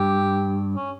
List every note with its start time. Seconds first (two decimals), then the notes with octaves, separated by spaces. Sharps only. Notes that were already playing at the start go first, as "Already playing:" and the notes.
Already playing: G2 G4
0.76 C#4